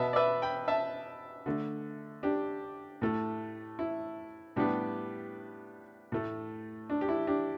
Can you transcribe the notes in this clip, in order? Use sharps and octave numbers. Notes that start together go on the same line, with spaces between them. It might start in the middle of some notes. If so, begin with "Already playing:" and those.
Already playing: B2 B3 E5 A5
D5
B4 E5
G5 B5
E5 A5
D3 A3
D4 G4
A2 A3
E4
A2 G3 B3 D4 G4
A2 A3
D4
G4
E4
D4 G4